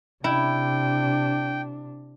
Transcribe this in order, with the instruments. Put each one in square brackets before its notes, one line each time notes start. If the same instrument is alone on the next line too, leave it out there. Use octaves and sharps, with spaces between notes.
[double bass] C3 D4 [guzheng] E4 [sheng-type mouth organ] G5